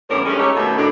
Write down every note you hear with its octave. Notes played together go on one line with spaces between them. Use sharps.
E2 A2 E3 G3 C#4 A#4
G2 G#3 A3 C#4
A3 D#4 G4 C#5
F#2 B2 D#3 A3
A2 D3 D4